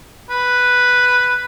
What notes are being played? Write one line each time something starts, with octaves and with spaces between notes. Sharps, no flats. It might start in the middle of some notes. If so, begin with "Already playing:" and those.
B4